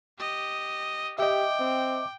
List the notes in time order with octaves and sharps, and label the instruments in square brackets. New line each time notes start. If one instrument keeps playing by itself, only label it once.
[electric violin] G4 D#5
[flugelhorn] G4 [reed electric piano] D#5 E5 [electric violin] G5 [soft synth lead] D6
[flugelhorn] C4